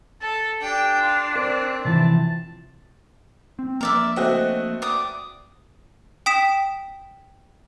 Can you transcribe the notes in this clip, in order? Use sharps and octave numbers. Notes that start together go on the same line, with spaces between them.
A4 A5
D4 G4 G5
F4
C4 A#4 D5
C3 E3 F3 A5
C4
F3 A#3 A#4 D5 E5
A3 C4 F#4 D#5
D5 D#6
G5 D#6 B6 E7